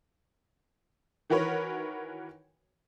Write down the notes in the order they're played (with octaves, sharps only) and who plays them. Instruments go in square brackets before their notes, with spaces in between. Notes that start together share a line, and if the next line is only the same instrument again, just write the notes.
[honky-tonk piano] D#3 E3 F#4 A#4 B4 C#5